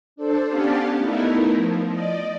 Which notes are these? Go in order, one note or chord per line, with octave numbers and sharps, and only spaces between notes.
D4 A4 C5
B3 C#4 G4 D5 F5 A5
A3 B3 D#4 E4 A#4
F3
D5 D#5